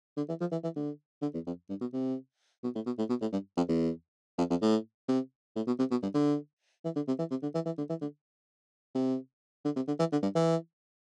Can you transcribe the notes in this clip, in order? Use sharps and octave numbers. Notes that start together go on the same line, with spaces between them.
D3
E3
F3
E3
E3
D3
D3
E2
F2
G2
B2
C3
B2
A2
B2
A2
B2
A2
G2
F2
E2
F2
F2
A2
C3
A2
B2
C3
B2
G2
D3
E3
D3
C3
E3
C3
D3
E3
E3
D3
E3
D3
C3
D3
C3
D3
E3
D3
G2
E3